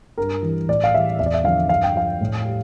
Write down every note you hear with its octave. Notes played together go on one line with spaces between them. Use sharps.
G2 A#4
E3 G3
A2 D5
F5
E3 G3 E5
E2 E5
D5
E5
D3 F3 F5
G2 F5
G5
F3 F5
A2
G3